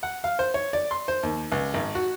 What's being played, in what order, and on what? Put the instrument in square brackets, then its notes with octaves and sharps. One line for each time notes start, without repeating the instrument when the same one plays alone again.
[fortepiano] F#5
F5
C5
C#5
D5
C6
C5
D#2
C#2
G#1
F#4